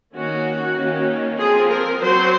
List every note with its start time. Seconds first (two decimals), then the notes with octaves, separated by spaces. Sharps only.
0.15 D#3 A#3 C#4 F#4
0.77 D#3 A#3 C#4
1.39 F3 C4 G#4
1.69 A#4
2.00 F#3 C4 C5